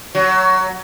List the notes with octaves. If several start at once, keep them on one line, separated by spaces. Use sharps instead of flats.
F#3